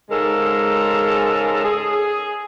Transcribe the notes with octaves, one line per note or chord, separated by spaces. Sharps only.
G#2 C#3 G#3 A4 A#4
G#4